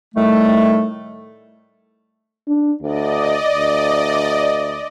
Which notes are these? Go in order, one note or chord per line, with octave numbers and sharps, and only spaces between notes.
A2 D#3 G3 A3
D4
D2 D5 D#5
D2